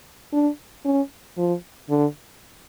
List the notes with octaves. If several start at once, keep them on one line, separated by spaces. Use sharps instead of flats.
D4
C#4
F3
D3